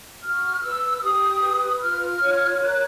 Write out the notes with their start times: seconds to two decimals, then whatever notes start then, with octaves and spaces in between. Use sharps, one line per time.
0.22 F#4 F6
0.62 B4 E6
1.01 G4 D#6
1.41 B4
1.81 F4 F6
2.21 C#5
2.61 A#4 F#6